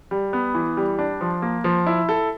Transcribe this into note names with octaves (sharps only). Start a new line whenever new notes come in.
G3
B3
E3
G3
D4
F3
A#3
F3
E4
A4